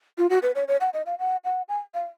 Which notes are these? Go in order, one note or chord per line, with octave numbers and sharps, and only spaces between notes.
F4
F#4
B4
C#5
C#5
F#5
D#5
F5
F#5
F#5
G#5
F5